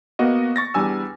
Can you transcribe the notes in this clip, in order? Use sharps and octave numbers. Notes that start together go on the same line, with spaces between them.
A#3 B3 F#4 D#5
C#6 A6 A#6
E2 G3 D4 G#5 E6